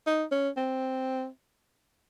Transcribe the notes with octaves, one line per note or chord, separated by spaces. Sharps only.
D#4
C#4
C4